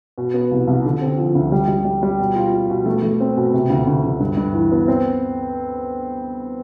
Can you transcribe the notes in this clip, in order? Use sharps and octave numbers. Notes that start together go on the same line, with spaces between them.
B2
B3
C2
C2
D3
C4
F3
D2
G3
G3
G3
G3
B2
F4
F4
B2
A3
A3
C4
B2
C3
D2
D2
D2
G2
G2
E3
B3
C4